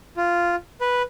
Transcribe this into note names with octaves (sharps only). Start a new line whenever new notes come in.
F4
B4